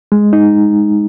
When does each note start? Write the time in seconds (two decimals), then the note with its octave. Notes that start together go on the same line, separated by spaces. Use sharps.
0.12 G#3
0.33 D#4